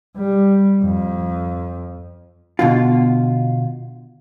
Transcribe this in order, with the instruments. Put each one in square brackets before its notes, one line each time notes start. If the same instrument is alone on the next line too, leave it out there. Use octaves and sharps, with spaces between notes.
[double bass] G3
F2
[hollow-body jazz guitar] B2 D3 F4